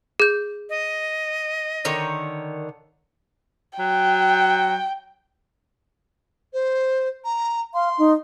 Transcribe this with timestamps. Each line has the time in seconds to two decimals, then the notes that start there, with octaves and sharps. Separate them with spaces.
0.20 G#4 G6
0.70 D#5
1.85 D3 D#3 C#5
3.79 F#3 G5
6.53 C5
7.24 A#5
7.74 F5 C6
7.98 D#4